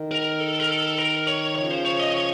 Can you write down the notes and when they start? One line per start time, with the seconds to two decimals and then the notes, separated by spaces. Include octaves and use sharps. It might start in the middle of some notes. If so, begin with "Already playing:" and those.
Already playing: D#3
0.11 A#4
0.40 A4
0.60 A#4
0.69 A4
0.98 A#4
1.27 C#5
1.56 C#3 F3 C#5
1.70 C5
1.85 C#5
1.99 D#5
2.14 C#5